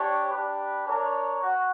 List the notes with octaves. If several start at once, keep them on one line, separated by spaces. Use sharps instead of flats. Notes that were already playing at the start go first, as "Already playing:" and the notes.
Already playing: D4 G4 C#5
D4 G4 B4
D4 A#4 C#5
F#4